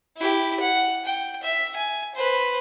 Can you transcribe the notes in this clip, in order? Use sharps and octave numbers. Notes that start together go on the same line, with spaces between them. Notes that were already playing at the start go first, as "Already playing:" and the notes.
E4 G4
F#5
G5
E5
G#5
B4 C5